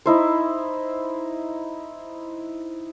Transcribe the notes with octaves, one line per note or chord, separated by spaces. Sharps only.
D#4 E4 C5